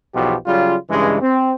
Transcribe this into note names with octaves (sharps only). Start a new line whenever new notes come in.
B1 E2 B2 F3 G4
C#3 F#3 G3 F4
G2 C#3 E3 G#3
C4